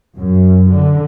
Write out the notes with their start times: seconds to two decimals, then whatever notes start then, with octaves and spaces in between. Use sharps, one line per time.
0.17 F#2
0.71 D3